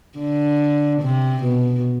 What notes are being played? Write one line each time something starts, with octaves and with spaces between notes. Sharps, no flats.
D3
C3
B2